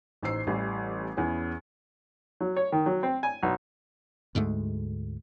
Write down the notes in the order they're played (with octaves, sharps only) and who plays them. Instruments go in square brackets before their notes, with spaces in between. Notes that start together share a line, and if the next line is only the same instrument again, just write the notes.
[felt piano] A1 D#4 C5 E6 C7
A1 A2 E3 G3
E2 C#4 E4 G#4
[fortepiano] F#3
C#5
D#3
F#3
C4
G#5
B1
[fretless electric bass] D2 G#2 G#3 A3